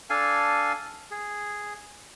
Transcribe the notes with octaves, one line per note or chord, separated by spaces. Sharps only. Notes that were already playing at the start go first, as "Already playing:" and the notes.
D4 A4 F5 G#5
G#4